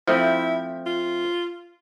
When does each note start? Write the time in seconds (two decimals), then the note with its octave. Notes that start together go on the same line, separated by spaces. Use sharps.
0.08 F3 A3 C4 E4
0.86 F4